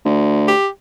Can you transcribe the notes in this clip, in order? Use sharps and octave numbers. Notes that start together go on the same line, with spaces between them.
D2
G4